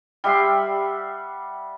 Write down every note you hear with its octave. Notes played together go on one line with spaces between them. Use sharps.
G3 E5 F#5 C6